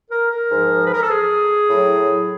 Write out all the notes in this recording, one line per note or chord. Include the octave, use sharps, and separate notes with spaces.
A#4
A#4
G#2 F3
B4
A#4
A4
G#4
A2 F#3